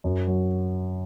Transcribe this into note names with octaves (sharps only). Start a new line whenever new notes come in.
F#2
F#3